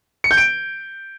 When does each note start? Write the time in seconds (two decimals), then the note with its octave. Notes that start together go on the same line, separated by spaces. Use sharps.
0.24 C#7
0.31 G6
0.37 D7